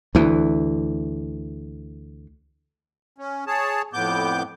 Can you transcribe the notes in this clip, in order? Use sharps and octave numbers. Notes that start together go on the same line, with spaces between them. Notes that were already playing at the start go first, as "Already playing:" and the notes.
D2 E3
C#4
G#4 C#5 A5
F2 A2 B3 D6 G6